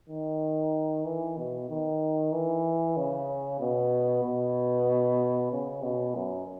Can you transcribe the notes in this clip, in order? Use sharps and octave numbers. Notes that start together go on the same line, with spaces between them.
D#3
E3
B2
D#3
E3
C#3
B2
B2
C#3
B2
F#2